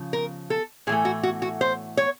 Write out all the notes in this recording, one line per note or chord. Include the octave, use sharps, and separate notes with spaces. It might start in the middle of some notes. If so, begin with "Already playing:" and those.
Already playing: C#3 F3
A#4
A4
A2 E3 A3 G#4
F#4
F#4
F#4
C5
C#5